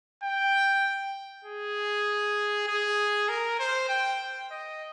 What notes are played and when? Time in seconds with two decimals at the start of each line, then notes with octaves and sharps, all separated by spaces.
0.24 G5
1.45 G#4
2.68 G#4
3.29 A#4
3.59 C5
3.89 G5
4.51 D#5